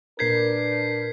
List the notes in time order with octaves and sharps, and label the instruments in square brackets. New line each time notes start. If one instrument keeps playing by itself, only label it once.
[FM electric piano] A#2 A#4 G6 [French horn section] D4 B4 [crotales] G#6 B6 C7